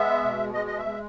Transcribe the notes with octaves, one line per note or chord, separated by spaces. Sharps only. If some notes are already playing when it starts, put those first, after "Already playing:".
Already playing: G#3 B3 E5
B2
G#3 D#5
D#5
E5
G#3